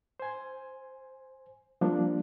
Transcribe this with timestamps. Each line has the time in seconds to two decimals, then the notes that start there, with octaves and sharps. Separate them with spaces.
0.20 C5 G#5
1.81 F3 G3 A#3 D4